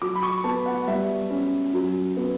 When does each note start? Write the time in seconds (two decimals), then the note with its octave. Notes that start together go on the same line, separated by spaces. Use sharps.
0.02 F#3 D6
0.15 B5
0.23 C#6
0.44 B3 A5
0.66 F#5
0.87 G3 E5
1.30 C#4
1.73 F#3
2.17 B3